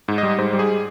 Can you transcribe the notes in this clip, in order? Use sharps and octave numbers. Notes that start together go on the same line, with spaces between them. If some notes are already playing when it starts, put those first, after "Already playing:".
G#2
D#5
G3
G#2 C5
G3
G#4